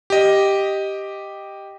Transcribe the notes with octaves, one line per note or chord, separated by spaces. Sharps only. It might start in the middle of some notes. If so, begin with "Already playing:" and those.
G4 D#5